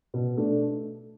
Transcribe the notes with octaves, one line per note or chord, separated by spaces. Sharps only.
B2
A3 D4